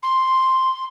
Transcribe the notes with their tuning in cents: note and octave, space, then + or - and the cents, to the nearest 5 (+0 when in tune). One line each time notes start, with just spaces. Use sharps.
C6 +0